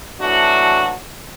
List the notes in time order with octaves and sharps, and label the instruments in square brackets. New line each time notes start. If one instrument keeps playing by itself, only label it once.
[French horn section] E3 F#3 A3 D4 F#4